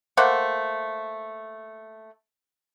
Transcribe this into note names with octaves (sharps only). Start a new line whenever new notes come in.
A3 A#3 C5 F#5